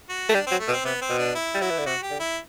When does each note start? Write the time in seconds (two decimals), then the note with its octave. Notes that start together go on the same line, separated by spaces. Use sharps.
0.09 F#4
0.29 A3
0.34 G3 D4
0.47 F#3 C4
0.60 A3
0.68 B2
0.72 C4
0.85 C3 B3
1.01 C4
1.09 B2
1.18 D4
1.35 E4
1.55 G3
1.61 F#3 E4
1.70 E3
1.78 D3
1.86 C3 F#4
2.02 G4
2.11 D3
2.20 E4